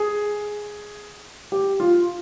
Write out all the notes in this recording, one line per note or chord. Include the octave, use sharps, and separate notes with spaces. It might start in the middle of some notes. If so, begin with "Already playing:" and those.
Already playing: G#4
G4
F4